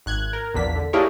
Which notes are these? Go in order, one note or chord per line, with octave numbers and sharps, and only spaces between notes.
G#1 F#6 G#6
A#4
A#1 E2 A#3 D4 B6
D3
A#3 D4 E4 G4 G#4 C#5